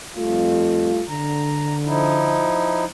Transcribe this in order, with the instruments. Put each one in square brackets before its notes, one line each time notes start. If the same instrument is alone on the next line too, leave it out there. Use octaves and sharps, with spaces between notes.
[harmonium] F2 [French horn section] G3 A3 F4
[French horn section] D3 [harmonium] A#5
[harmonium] F3 D#4 E4